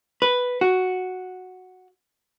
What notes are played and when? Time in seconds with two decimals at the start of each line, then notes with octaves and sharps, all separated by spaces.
0.22 B4
0.61 F#4